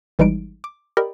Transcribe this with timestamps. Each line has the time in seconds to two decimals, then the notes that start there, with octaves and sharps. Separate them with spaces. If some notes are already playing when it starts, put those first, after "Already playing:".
0.19 G#1 E3 G3 G#3 D#4 D7
0.64 D6
0.97 G4 A#4 D5 D#5 G5 B5